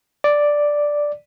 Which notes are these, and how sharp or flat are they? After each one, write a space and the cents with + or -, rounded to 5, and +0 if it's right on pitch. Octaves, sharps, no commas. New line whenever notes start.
D5 +0